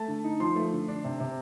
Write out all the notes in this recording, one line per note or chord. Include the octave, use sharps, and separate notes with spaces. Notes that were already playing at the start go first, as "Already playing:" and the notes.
Already playing: A3 A5
D3
D#4
F3 C6
A3
D3
D4
C3
C3